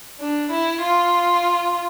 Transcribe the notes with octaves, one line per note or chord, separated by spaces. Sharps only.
D4
E4
F4